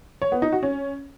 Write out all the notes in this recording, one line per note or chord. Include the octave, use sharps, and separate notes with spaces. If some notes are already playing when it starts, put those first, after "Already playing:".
C#5
B3
D#4
F#4
C#4